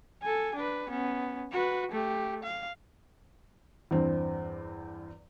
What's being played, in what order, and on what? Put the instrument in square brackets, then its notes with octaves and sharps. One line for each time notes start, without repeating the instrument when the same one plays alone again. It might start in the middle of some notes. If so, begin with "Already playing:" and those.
[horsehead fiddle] A4 G#5
D4 B4
B3 C#4
F#4 B4
A3 G4
F5
[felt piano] E2 G2 C4